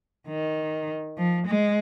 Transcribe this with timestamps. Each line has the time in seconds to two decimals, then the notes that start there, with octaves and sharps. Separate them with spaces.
0.28 D#3
1.18 F3
1.47 G#3